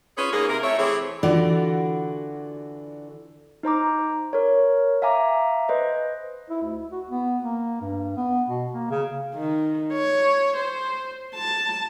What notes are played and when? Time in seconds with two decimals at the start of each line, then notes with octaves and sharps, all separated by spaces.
0.18 C#4 F4 G#4 B4 C#5
0.32 G#2 A#3 G#4
0.49 C3 A#4
0.63 A3 C#5 E5
0.78 E3 A3 C4 G4 G#4 C#5
1.23 D3 E3 F4 F#4 D5
3.63 D#4 C5 A#5 D6
4.33 A#4 C#5
5.02 E5 F5 G#5 A#5 D6
5.69 B4 C5 D#5
6.50 E4
6.61 D2
6.91 F#4
7.10 B3
7.43 A#3
7.81 G2
8.17 B3
8.48 B2
8.72 A#3
8.91 C#3
9.35 D#3
9.93 C#5
10.57 C5
11.35 A5